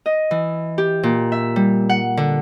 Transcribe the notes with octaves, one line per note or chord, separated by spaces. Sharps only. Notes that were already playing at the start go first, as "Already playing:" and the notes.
D#5
E3
G4
A#2
E5
G3
F#5
D3